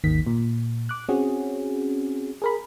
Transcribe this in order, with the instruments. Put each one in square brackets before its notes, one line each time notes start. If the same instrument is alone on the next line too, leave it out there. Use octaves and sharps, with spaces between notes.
[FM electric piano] G#1 D#2 D#3 B6
A#2
D6 F#6
C4 C#4 F#4 G#4
G#4 A#4 B5